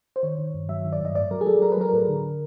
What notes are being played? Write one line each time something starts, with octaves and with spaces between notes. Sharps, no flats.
C5
D#3 C#5
D#3
G2
F#3 E5
D#3
D5
G2 D#5
A2 D5
F#3 A#4
G#4
F#3 A4
F#3 A#4
B4
F#3 A#4
A2
D3